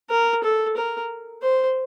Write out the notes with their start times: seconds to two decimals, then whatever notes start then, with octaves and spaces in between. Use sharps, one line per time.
0.10 A#4
0.43 A4
0.76 A#4
1.42 C5